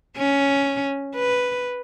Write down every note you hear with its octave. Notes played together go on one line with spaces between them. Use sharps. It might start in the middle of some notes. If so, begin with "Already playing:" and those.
C#4
B4